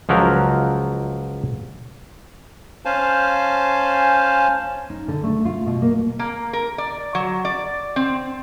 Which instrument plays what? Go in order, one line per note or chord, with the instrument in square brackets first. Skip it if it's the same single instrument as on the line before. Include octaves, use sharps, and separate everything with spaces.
[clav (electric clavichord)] C#2 F3 F#3 A#4
[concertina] C#4 C5 F5 G#5 A5
[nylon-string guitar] D#4
D3
A3
F4
B2
A#3
[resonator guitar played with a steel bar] A#3
A#4
D5
F#3
D5
C4